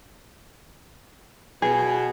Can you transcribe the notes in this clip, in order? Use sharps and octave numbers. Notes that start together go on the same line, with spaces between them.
B2 G#4